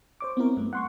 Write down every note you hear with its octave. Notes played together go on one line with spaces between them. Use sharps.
C5 C#5 D6
B3 C4 E4 A#4
G2 A3
F#5 C6 C#6